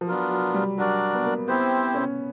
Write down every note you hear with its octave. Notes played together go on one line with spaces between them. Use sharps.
F3
F#3 B3 D4 F4 A#4
F#3
G3
F#3 D4 F#4 A#4 D5
B3
A#3
B3 C4 E4 G4 C5
C#4